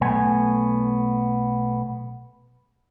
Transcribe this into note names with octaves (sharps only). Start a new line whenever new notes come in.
B1 A3 B3 G#5